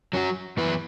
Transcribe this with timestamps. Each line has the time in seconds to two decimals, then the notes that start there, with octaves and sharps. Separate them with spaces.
0.13 F#3 C#4 F#4
0.57 F#2 E3 B3 E4 B4